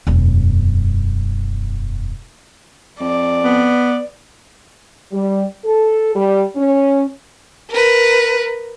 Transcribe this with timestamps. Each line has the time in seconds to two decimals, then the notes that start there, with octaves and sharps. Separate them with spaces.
0.07 E1 F#2
3.00 F2 D5
3.42 B3
5.12 G3
5.64 A4
6.15 G3
6.56 C#4
7.70 A#4 B4